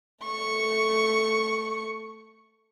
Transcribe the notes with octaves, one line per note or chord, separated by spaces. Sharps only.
A3 C#6